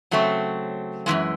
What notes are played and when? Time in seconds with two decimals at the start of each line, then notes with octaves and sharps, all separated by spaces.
0.11 C#3 F#3 A3 C4
1.06 F#2 C#3 E3 G#3